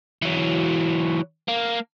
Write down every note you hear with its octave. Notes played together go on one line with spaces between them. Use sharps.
E3 F#3
A#3